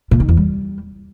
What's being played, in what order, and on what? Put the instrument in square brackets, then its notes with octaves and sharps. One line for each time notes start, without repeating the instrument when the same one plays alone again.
[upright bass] A#2
D#3
E2
G3